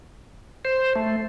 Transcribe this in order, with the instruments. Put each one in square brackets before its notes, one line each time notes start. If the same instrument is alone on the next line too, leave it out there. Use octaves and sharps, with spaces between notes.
[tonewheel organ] C5
A3